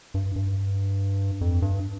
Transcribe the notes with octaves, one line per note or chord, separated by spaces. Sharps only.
G2
G2
F2
G2